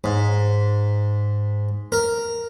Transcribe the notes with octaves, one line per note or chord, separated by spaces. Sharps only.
G#2
A#4